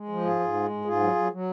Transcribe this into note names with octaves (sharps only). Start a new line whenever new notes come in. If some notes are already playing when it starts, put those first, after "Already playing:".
Already playing: G#3
F3
G#2 F4 G#4
G#2
G#3
G#2
G#2 F4 G#4
F#3
F#3
F#3